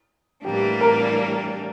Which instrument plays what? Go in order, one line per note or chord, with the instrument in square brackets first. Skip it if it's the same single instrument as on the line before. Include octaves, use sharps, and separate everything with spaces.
[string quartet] A2 E3 G3 A#3 D4 [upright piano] G4
[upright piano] A#4